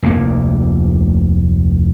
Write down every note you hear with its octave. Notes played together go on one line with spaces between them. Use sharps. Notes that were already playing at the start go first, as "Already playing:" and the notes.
F1 D2 C3 A#3